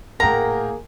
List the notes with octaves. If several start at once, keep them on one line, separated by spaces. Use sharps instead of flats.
D#1 A2 A#3 G#4 A#4 F#5 G5 A#5